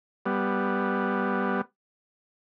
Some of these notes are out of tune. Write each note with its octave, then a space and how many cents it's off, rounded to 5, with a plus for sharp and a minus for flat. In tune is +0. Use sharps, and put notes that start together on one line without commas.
G3 +0 B3 +0